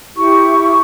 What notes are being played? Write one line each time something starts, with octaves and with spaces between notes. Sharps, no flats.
E4 G4 C#6